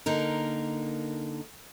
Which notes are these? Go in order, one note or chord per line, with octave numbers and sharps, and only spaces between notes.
D3 A#3 D#4 A#4